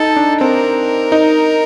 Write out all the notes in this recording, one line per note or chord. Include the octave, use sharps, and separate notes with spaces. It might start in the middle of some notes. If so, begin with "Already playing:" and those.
Already playing: D#4 A4
D4
C4 A#4
D#4